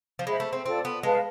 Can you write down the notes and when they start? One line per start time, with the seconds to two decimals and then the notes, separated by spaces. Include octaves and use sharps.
0.19 F3
0.27 G#3 C5 E5 B5
0.40 A3
0.53 C4
0.66 C4 F4 A4 D5
0.85 B3
1.03 G#3 B4 F5 A5